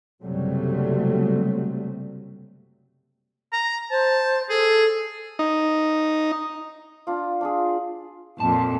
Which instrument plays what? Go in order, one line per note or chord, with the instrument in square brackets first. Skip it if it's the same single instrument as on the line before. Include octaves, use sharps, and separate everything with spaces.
[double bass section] F#1 C3 F#3 G3 A3
[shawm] A#5
[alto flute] C5 [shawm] A5
[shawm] G#4 [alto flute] A4
[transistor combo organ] D#4
[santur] D4 F4
D4 F4 G#4
[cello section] F2 A#2 [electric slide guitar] A5